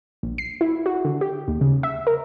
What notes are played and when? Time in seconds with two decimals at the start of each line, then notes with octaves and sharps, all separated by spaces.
0.23 A#1
0.38 C7
0.61 E4
0.86 F#4
1.05 D3
1.21 G4
1.48 D#2
1.61 C#3
1.83 E5
2.07 A#4